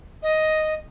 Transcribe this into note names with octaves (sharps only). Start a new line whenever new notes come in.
D#5